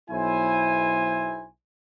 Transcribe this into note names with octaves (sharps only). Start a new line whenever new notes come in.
B1 E4 C5 G#5